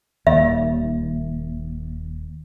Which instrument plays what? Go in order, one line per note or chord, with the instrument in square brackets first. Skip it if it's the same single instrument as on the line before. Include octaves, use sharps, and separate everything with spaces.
[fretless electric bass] D#1 D#2 [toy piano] E5